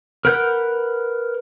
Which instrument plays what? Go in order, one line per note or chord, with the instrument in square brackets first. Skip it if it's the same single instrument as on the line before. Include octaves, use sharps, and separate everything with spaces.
[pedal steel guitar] A#4 B4 F#5 G6